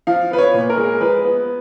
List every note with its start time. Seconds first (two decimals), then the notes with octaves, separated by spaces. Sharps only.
0.07 F3 F5
0.30 B3 B4
0.38 C#5
0.54 A#2
0.70 A#4
0.77 G#3
1.01 F3 B4
1.24 B3